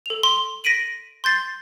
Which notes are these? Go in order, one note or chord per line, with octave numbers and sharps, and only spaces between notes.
A4 F7
C6
A#6 B6 D7 D#7 F#7
C6 G6 A6 C7